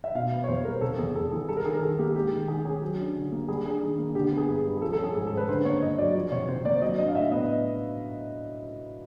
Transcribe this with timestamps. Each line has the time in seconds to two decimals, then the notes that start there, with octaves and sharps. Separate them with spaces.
0.04 E5
0.15 B2 F5
0.32 B3
0.44 C#5
0.48 E2 C5
0.65 G3 A#4
0.81 C3 A4
0.99 E2 G#4
1.15 E2 A4
1.32 E3 G#4
1.49 G3 A4
1.57 A#4
1.65 D#3 G#4
1.74 A#4
1.82 D#3 A4
1.98 A#3 G4
2.15 G#3 G4
2.32 D#3
2.48 D#3 G#4
2.65 C#4 G#4
2.82 F#3
2.99 D4
3.15 D3
3.32 A#3
3.48 G3 G#4
3.65 D4 G#4
3.82 D#3
3.98 A#3
4.15 D3 G4
4.32 B3
4.38 G#4
4.49 G2
4.65 G3
4.77 G#4
4.82 F3 A4
4.93 A4
4.99 C#4 G#4
5.15 G#2 G#4
5.27 A4
5.32 G#3 C5
5.37 B4
5.49 D3 C5
5.65 A#3 C#5
5.82 G2 D#5
5.98 F#3 D5
6.15 F3
6.32 C3 C#5
6.48 C3 C5
6.65 A#3 D5
6.82 F#3 D#5
6.98 D4 D#5
7.08 F5
7.15 A2 E5
7.32 B3 D#5